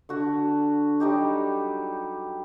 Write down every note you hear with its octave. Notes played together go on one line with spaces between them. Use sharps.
D3 F#4
F#3 G3 D#4 G4